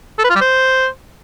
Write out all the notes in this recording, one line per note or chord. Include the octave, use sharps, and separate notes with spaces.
A4
B4
F4
G3
C5